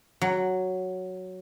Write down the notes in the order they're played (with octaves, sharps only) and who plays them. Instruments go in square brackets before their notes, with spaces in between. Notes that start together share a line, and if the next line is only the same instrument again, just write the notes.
[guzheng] F#3